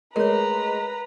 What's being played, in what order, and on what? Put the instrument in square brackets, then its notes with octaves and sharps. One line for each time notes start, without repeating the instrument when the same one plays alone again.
[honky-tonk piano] G#3 [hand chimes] A3 G#4 [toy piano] A#4 C#5 [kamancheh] B4 A#5